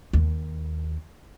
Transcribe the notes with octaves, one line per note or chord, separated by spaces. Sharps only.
D#2